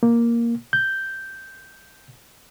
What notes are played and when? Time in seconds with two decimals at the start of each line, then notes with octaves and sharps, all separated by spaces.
0.03 A#3
0.73 G6